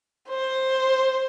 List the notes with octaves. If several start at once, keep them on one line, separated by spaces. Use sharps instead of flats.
C5